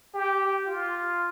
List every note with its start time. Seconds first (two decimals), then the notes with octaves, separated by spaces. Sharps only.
0.14 G4
0.66 F4